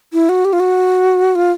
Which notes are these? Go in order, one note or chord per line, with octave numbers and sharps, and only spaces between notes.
E4
F#4
G4
F4
F#4
F4